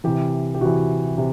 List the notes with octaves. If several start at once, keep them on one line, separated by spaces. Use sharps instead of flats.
C3 E3 G4
G4
C3 E3 F#4
C3